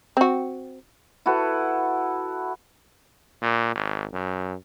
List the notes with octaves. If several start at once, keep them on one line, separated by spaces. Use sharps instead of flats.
C4 F#4
E4 F#4 A4 B4
A#2
G#1
F#2